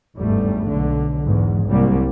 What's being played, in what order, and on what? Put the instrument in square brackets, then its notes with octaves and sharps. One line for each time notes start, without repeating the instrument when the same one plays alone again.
[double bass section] G1 E2 G#2 G3 A3
B1 D3
E2 G#2
C2 F#3 G3 A#3